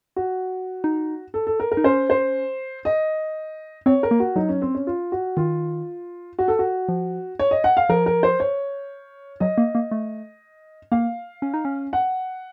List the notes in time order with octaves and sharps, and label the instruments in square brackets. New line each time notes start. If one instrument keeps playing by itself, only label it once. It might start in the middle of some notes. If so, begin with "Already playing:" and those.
[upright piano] F#4
[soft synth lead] D#4
[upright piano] A4
A4
A#4
A#4
[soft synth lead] D#4
[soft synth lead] C#4 [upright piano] C5
[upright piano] C5
D#5
[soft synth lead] C4 [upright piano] C#5
[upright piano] A#4
[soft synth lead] A#3
[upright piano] F#4
[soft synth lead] F#3 [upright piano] D#4
[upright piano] C#4
C4
C#4
F4
F#4
[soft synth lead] D#3 [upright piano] F4
[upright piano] F#4
A4
F#4
[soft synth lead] F3
[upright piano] C#5
D#5
F#5
F5
[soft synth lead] F3 [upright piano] A#4
[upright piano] A#4
C5
C#5
[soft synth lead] F#3 [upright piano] D#5
[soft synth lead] A#3
A#3
A3
[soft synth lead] A#3 [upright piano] F5
[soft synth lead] C#4
D#4
C#4
[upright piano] F#5